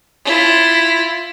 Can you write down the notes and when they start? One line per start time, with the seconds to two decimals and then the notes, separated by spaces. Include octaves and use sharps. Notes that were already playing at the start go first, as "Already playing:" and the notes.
0.25 E4 F4